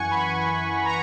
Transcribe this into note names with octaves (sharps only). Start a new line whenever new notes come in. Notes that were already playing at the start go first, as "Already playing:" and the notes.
Already playing: F#2 E3 F#5 G#5 C#6
B5
G#5
A#5